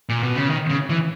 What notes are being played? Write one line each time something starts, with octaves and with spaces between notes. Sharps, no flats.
A#2
B2
C#3
D#3
C#3
E3